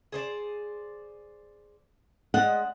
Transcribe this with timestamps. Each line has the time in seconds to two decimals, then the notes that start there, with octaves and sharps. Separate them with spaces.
0.12 G#4 C5 D5
2.34 G#3 D4 D#5 F#5